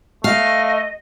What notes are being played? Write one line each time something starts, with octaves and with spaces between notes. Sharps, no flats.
A3 D#5 F5